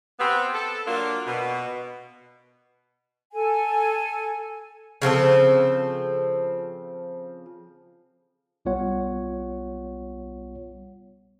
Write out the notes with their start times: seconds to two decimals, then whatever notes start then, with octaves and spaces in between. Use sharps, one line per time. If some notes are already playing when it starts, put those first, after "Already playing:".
0.20 B3 C4
0.54 A4
0.87 F#3 A#3 D4 F4
1.27 B2
3.33 A4 G#5
5.02 C#3 F3 C4 A4
8.65 B1 G3 B3 F4 C#5 F#5